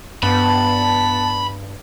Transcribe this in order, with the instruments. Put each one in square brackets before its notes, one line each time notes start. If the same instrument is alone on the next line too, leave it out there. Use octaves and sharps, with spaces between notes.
[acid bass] G2 [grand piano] B3 [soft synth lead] A5 [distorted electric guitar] B5